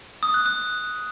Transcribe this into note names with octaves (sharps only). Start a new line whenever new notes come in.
D#6
F#6
D#6